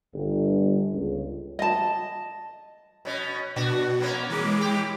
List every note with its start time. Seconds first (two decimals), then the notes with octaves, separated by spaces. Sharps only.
0.14 G1
0.93 C#2
1.59 D#5 A5
3.05 B2 C#4
3.56 B2 D4 F#4
4.00 A#3 B3 C#4
4.30 E3 G#3 D6
4.61 G4